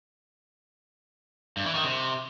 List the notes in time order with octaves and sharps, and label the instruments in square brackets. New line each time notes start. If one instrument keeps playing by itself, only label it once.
[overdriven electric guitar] G2
E3
D#3
C3